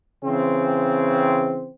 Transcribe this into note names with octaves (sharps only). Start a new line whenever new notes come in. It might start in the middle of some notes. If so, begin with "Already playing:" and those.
C#3 E3 C4